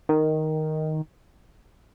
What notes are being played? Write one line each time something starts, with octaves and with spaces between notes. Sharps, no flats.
D#3